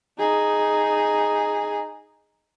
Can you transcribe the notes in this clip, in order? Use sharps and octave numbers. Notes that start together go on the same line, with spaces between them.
D#4 G#4